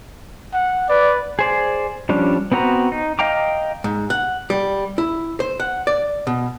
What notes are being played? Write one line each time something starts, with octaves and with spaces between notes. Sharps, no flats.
F#5
B4 D5
G#4 C5 D5
F3 G3 C#4 D4
B3 C4 F#4 B4 A#5
D#4
D#5 F5 G5 A#5 D6
G#2
F#5
G3
E4
C5
F#5
D5
B2